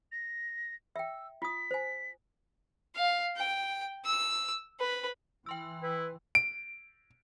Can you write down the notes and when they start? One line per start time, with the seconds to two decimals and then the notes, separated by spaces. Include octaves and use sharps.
0.12 A#6
0.96 E5 G5 E6
1.42 F4 D#6 B6
1.71 C5 G#5
2.95 F5
3.37 G5
4.05 E6
4.79 B4
5.46 E3 G5 C6 E6
5.83 E4 B4
6.35 D7